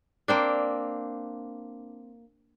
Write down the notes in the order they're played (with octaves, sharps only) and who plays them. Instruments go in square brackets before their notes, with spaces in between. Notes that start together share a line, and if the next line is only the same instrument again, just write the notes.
[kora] A#3 C4 D4